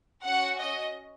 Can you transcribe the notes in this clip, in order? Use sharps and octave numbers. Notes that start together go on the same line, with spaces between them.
C#4 F#4 F#5
D#5